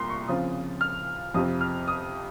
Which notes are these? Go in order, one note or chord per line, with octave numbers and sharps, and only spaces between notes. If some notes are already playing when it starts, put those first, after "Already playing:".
Already playing: C2 A#2 A#5 C6
C#6
C#3 F3 C4 F4 D#6
F6
F2 C3 F3 C4 D#6
F6
D#6